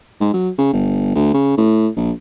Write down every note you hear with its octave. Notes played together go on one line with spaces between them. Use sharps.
G#2
F#3
C#3
G1
D2
C#3
A2
A#1